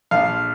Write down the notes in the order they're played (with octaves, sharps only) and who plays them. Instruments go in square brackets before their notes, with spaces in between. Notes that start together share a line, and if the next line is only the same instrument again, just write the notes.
[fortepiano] A#1 F5